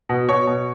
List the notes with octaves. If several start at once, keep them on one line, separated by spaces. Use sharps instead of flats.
B2
B2 C#5
B2